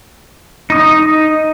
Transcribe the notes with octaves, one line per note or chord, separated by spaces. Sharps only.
D#4 D#6